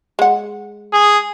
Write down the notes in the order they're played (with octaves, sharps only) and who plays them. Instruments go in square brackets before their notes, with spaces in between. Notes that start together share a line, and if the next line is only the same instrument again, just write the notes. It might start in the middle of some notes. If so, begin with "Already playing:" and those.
[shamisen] G#3 F#5
[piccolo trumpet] G#4